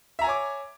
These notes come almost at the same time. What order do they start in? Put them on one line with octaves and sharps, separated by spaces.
E5 A#5 G#5 C#5 D6